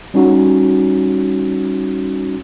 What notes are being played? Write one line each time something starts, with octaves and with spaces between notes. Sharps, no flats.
G3 C#4 D#4 F#4